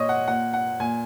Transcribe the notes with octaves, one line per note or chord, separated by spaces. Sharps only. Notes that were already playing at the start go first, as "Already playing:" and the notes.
Already playing: A#2 C#5 D#5
F#5
A#2 F#5
F#5
A#2 G#5